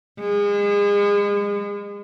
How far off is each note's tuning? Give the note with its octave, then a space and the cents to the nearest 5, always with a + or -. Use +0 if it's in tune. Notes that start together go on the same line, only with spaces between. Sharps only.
G#3 -35